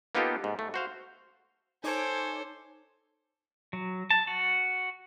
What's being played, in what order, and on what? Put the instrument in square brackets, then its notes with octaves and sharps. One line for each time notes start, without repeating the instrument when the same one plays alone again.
[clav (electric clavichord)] A#3 B3 D#4 F4 G4 A4
G#2
A3
F#4 C5 F5
[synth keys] D#4 C#5 D6 [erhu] A4 [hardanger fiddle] C5 [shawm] G#5
[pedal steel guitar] F#3
A5
F#4